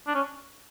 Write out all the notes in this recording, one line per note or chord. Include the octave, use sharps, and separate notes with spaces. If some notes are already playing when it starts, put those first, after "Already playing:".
D4
C#4